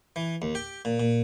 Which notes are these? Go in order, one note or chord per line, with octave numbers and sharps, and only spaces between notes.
E3
D#2
G4
A#2
A#2